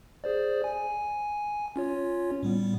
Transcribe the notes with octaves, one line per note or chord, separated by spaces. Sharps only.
G#4 C5 D5
G#5
C#4 F4 C#5
A2 G3 B3